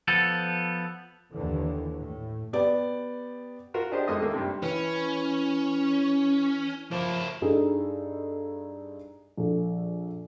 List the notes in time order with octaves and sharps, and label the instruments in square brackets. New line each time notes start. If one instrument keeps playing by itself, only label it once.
[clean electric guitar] F3 B3 A4
[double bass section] D#2 D3 E3
A2
[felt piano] B3 G4 D5
[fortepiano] F4 F#4 A#4
D4 G4 G#4 C5 D#5
G#2 G#3 A#3 A4 D#5 D#6
D#2 A3 A#3
G2 C3
[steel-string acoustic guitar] E3 [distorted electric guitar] C#4
[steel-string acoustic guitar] F3 [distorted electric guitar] A#3 E4
[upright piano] G2 D#4 G#4 A4 D#5
A#1 A4